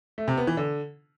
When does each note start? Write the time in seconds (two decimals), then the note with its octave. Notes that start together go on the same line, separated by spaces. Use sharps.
0.18 A3
0.28 C3
0.38 B3
0.47 E3
0.57 D3